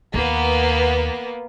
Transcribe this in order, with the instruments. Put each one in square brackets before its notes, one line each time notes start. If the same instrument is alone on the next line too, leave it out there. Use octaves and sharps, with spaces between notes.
[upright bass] D#2 [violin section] A#3 B3